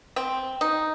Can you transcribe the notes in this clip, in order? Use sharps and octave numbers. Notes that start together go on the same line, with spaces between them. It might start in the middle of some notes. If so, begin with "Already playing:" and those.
C4
D#4